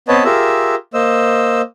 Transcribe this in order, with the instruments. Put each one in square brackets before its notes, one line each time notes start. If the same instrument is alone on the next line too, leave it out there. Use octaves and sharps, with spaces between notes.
[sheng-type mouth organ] B3 C4 B4 C#5 D#5 A5
F4 G4 G#4 A#4 E5 E6
A#3 C5 D#5 E6